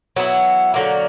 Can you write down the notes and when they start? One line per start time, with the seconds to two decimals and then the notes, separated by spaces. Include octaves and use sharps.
0.16 F#3 B3 E4
0.74 D3 F#3 A#3